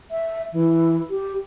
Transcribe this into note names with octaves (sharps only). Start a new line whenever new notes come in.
E5
E3
G4